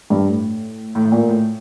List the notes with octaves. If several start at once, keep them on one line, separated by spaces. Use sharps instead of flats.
G2
A2
A2
A2
A#2
A2